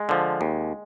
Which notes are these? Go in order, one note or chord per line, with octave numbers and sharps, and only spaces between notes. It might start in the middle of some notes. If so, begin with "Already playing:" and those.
Already playing: G#3
D3 F3
D#2